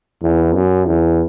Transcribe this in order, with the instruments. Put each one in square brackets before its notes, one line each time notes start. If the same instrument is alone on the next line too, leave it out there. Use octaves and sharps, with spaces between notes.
[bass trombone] E2
F#2
E2